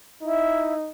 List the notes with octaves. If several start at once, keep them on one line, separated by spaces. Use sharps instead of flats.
D#4 E4